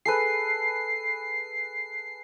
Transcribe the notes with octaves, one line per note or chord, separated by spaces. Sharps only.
G#4 A4 B4 C7